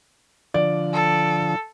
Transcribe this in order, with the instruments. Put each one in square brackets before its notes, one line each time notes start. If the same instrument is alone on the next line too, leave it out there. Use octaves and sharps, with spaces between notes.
[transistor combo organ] D3 F3 [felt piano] D5
[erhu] A4